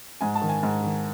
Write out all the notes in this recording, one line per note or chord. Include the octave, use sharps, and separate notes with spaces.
G#2 G#5
A5
D#3
G#5
G#2
D#3